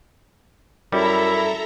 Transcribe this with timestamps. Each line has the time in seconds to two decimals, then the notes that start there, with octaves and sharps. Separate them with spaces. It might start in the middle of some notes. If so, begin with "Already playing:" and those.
0.92 F#2 G3 E4 A4 E5 A#5